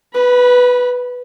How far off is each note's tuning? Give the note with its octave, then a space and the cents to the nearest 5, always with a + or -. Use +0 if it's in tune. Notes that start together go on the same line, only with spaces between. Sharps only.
B4 +0 B5 -30